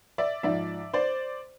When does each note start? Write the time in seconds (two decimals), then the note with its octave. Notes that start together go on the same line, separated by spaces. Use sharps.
0.18 D5 E5
0.43 G#2 F3 D5 E5
0.93 C5 D5